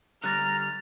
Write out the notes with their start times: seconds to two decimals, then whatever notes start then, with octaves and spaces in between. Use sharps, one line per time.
0.24 D3 G3 A#5 F6 F#6 A6 A#6